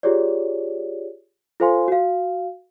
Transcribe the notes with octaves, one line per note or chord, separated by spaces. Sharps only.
F4 G4 G#4 C#5 D5
F4 A4 C5 F5 G#5 C6
F#4 F5